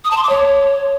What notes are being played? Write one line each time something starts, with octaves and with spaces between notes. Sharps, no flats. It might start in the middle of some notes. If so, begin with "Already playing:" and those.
D#6
A5
C6
D6
C#5